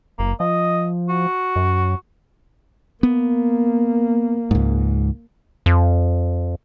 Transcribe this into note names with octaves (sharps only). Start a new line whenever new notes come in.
F#1 A#3
F3 D#5
F#4
F#2
A#3 B3
C#2 G#2
F2